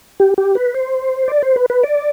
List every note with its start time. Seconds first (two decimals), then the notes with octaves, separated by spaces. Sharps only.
0.20 G4
0.38 G4
0.55 B4
0.74 C5
1.28 D5
1.43 C5
1.56 B4
1.70 B4
1.83 D5